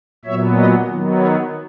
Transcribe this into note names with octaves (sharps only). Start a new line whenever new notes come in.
A#2 F#3 B3 C#5 E5
B4 D#5
D#3 F#3 B3
A#4 C#5